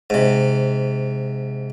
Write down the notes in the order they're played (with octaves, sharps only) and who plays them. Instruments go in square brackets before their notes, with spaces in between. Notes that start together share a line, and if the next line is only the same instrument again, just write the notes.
[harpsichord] G#2 C3